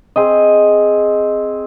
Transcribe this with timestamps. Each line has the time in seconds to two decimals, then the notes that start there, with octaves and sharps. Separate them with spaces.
0.16 C4 G#4 D#5